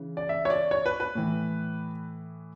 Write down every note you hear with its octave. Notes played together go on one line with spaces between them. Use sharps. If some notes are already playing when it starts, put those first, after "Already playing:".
Already playing: C#3 E3
D5
E5
C#5
D5
C#5
B4
B4
A2 E3